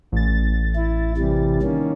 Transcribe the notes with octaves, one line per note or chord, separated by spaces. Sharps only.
A1 A6
E4
C3 E3 G3
D#3 A#3 C#4